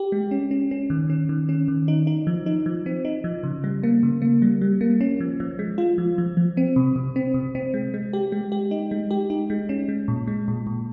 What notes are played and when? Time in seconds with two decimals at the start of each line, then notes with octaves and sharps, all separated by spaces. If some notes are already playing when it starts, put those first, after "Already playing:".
Already playing: G4
0.12 G#3
0.31 C#4
0.51 C#4
0.71 C#4
0.90 D#3
1.10 C#4
1.29 D#3
1.49 C#4
1.68 D#3
1.88 D#4
2.07 D#4
2.27 F3
2.46 D#4
2.66 F3
2.86 C4
3.05 D#4
3.24 F3
3.44 C#3
3.64 G3
3.83 A#3
4.03 C#3
4.22 A#3
4.42 G3
4.61 G3
4.81 A#3
5.01 C#4
5.20 F3
5.40 F3
5.59 G#3
5.78 F4
5.98 F3
6.18 F3
6.37 F3
6.57 C4
6.76 C3
6.96 C3
7.16 C4
7.34 C3
7.55 C4
7.74 G#3
7.94 G#3
8.13 G4
8.32 G#3
8.52 G4
8.71 D#4
8.91 G#3
9.11 G4
9.30 D#4
9.50 G#3
9.69 C#4
9.89 G#3
10.08 A#2
10.28 G#3
10.48 A#2
10.67 A#2